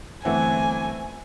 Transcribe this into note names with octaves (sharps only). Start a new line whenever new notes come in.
G1 E3 A3 C4 E5 F#5 G#5